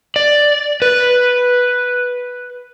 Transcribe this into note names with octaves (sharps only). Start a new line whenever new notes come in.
D5
B4